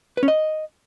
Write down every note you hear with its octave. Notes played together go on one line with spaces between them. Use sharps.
B4
C#4
D#5